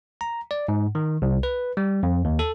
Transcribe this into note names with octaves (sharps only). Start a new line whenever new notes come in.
A#5
D5
G#2
D#3
C2
B4
G3
F2
D#2
A4